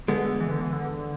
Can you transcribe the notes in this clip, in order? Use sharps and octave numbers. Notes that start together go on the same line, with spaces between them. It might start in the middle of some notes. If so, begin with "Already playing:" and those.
D3 G#3 B3
E3
D3
E3
D3